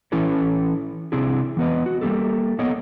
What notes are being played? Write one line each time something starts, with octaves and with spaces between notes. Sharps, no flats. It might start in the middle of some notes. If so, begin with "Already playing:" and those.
E3 C#4 E4 A4 B4 C#5
C3 C4 D4 E4 G#4
E3 B3 B4 D#5
F#4
G3 A#3 D#4 G4 A4
A#3 B3 A4 C#5 D#5